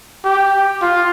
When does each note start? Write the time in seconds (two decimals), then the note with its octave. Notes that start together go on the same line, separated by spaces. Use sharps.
0.25 G4
0.82 F4